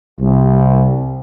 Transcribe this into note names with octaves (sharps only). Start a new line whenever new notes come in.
C2